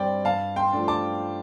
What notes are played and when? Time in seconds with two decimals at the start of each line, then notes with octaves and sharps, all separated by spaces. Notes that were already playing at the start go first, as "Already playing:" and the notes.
Already playing: G2 G3 C4 D5 G5
0.25 G2 F5 A5
0.56 G5 C6
0.73 F3 A3 D4
0.88 A5 D6